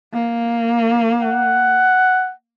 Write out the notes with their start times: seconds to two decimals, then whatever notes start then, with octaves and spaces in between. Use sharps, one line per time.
0.13 A#3
1.22 F#5